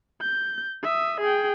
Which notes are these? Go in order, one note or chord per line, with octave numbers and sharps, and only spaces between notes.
G6
E5 D#6
G#4 G5